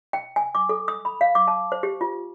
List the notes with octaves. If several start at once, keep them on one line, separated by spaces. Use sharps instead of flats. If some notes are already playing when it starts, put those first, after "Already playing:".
G5
G#5
D6
A4
D#6
B5
F5
D6
A5
C5
G4
F4